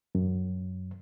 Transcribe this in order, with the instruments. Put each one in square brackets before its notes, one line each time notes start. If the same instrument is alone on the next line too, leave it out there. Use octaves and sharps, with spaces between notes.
[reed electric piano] F#2